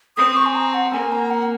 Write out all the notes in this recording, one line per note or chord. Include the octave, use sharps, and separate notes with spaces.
C4 D#6
C#6
G#5
A#5
F#5
A#3 G#5
A#5
F#5